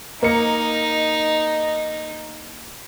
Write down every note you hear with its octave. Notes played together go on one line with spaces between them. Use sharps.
A#3 D#4 D#5 C#7